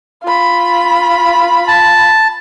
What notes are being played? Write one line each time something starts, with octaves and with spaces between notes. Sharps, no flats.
F4 B5
A5